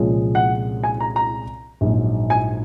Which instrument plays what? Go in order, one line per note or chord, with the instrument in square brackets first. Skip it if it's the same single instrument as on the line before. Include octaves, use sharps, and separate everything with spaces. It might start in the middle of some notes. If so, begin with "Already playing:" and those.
Already playing: [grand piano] C2 A#2 F3 G#3 C#4
[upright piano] F#5
G#5
A#5
A#5
[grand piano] A#1 G#2 F#3
[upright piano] G#5